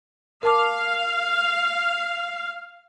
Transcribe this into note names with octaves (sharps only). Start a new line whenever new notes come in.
A#4 F5 A5 D6